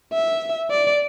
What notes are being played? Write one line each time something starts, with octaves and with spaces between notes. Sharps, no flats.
E5
D5